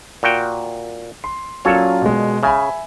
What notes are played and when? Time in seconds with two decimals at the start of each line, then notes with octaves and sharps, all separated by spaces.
0.23 A#2 F#4 G5
1.24 C6
1.65 A#2 F#3 C#4 F4 A4 C#5
2.02 B2 G#3
2.43 C#3 E5 G#5 B5